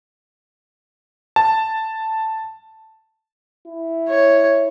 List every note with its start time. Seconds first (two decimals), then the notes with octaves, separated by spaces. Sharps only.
1.36 A5
3.67 E4
4.08 C#5